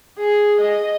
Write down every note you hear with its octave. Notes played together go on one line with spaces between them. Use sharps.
G#4
D#5